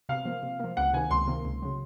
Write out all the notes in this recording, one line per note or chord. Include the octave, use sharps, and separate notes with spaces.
C3 F5
F3 A#3
C3
F3 A#3
C#2 F#5
C3 D#3 A#3 G#5
C#2 C6
C3 D#3 A#3
C#2
C#3 F#3